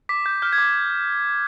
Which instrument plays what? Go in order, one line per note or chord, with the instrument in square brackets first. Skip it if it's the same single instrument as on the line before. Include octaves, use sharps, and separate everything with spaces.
[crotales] D6 B6
G6
F6 G6
G#6
D6